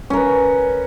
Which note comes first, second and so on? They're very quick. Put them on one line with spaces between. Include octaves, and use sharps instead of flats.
C#4 A#4 B4